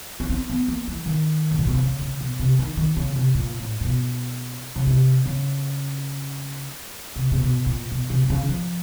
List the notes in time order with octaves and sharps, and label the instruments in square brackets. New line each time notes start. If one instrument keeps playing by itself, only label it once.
[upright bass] C#4
C4
B3
A#3
E3
D#3
A2
A#2
B2
C3
C#3
C#3
B2
C3
D#3
D#3
C#3
C3
A#2
A2
A#2
B2
C#3
C3
C#3
C3
C3
B2
A#2
B2
C3
C3
C#3
F3